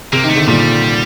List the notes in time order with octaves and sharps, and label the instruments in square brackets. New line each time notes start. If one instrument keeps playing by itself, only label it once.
[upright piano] C3 [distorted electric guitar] A#3
[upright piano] D#3
[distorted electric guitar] A3
[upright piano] D3
[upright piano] A#2 [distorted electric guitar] G3